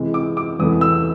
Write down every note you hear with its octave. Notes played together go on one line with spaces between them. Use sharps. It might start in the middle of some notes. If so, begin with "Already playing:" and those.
Already playing: C3 E3 G#3
D6
D6
E2 C3 E3 A3 D#6
E6